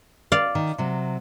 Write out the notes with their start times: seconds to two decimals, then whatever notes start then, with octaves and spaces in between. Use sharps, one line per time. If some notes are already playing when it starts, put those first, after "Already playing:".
0.32 D5 F5
0.55 D#3
0.78 C3 F#3